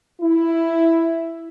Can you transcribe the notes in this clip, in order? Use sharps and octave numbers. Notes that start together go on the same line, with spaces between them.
E4